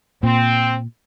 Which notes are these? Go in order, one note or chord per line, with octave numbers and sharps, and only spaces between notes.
A#2 C4